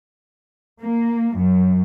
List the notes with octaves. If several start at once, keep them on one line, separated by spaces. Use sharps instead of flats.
A#3
F#2